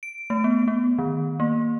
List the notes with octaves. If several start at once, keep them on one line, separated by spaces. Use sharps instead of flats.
D7
A3
B3
B3
D#3
A#3